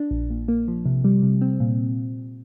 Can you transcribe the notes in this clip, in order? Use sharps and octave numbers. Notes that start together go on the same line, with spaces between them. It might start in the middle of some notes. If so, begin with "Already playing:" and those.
Already playing: D4
A#1
A#2
A#3
F3
C3
G3
C3
C4
A#2